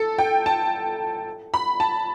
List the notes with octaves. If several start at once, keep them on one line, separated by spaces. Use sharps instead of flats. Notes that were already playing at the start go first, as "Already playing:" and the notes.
Already playing: A4
G5
A5
B5
A5